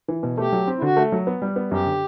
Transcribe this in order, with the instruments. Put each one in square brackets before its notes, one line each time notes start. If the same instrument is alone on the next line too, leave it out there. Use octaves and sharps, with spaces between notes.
[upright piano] E3
B2
[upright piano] A3 [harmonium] G4
[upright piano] F#3
C4
[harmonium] E4
[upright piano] D3 [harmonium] F#4
[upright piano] A3
F#3
B3
G3
B3
[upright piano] F#2 [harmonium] G4
[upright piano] D3